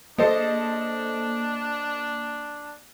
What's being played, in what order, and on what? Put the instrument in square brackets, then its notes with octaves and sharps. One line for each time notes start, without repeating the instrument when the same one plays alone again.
[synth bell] A#3 [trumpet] D4 [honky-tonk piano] A4 C5 D#5